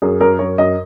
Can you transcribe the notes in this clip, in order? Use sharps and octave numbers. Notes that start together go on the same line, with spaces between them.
F#2 G#4
F#2 A#4
F#2 C#5
F#2 D#5